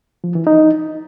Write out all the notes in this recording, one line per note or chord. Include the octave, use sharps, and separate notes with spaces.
F3
E3
D#4